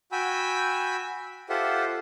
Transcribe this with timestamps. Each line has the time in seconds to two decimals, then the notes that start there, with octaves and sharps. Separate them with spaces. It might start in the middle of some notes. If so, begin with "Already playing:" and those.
0.12 F#4 G5 G#5 B5 E6
1.49 F4 G4 A4 C5 E5 F#5